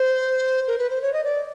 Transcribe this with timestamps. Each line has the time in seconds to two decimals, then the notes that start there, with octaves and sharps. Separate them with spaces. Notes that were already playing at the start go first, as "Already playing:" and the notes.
Already playing: C5
0.67 A#4
0.78 B4
0.90 C5
1.02 C#5
1.13 D#5
1.24 D5